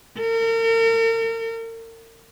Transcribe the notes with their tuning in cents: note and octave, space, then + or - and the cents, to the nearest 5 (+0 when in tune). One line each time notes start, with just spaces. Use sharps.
A#4 -40